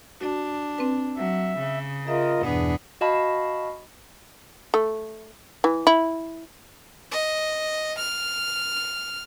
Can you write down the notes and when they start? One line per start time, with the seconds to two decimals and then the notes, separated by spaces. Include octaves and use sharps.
0.21 D4 F#4
0.78 C4 B4
1.17 F#3 E5
1.59 C#3
2.07 F4 G#4 A#4 D#5 E5
2.42 E2 G2 B2 E3 B3 D4 G#4
3.01 F#4 D#5 F5 A5 B5
4.74 A3
5.64 E3
5.87 E4
7.12 D#5
7.98 F6